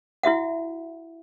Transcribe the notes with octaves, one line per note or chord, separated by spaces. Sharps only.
E4 F#4 E5 F#5